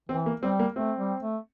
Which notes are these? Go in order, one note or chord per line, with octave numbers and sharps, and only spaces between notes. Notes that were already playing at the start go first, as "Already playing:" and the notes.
E3 C4
A#3
G3 C4
A#3
A3 C4
G3
A3